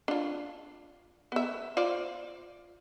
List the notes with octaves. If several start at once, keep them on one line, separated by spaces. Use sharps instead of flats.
D4 F4
B3 E5
F4 C5 D5